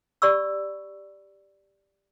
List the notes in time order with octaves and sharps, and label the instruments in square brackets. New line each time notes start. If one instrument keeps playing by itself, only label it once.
[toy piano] G4 D5 B5 C#6 E6